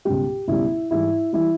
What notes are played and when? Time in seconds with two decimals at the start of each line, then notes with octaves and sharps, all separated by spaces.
0.05 C#2 B2 G3 G4
0.48 C#2 B2 G3 E4
0.90 G#2 E3 G3 E4
1.33 E3 G3 E4